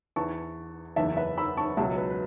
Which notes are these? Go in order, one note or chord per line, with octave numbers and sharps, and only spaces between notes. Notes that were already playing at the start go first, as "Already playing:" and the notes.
E2 E3 A5 C#6
F#1 E2 E3 E5 A5
B4 E5
B5 E6
A5 C#6
C#2 B2 F#3 E5 A5
B4
B4